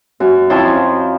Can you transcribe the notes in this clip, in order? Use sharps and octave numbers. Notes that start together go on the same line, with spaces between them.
F#2
F2 F3 E4 C5 C#5 A5